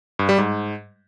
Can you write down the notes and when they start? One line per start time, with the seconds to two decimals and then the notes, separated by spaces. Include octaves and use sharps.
0.19 G2
0.29 G3
0.38 G#2